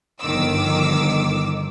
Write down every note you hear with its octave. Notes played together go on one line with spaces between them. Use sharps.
G1 D#3 F3 D6 E6